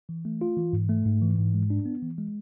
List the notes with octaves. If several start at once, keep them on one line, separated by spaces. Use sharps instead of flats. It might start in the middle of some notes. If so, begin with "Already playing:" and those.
E3
A3
F4
E3
G#2
A3
G#2
E3
G#2
G#3
D4
B3
E3
G#3